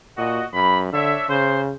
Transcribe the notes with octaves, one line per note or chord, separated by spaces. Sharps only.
A#2 F#4 D#5
F#2 B5
D3 D4 C#5 E5
C#3 C5